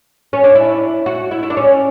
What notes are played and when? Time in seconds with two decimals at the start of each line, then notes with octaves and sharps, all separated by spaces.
0.33 C#4
0.44 D4
0.55 E4
1.06 F#4
1.31 E4
1.43 E4
1.50 D4
1.57 C#4